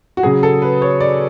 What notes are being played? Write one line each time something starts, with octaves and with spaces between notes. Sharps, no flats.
F#4
C#3 F#3 G#4
A4
B4
C#5
D5